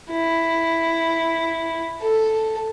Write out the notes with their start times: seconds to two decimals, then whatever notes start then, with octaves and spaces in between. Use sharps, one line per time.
0.11 E4
2.00 A4